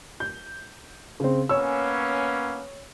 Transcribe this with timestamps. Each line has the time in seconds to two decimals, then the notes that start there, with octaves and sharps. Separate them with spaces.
0.20 G6
1.20 C#3 C4
1.49 A#3 B3 C#4 C#5 E6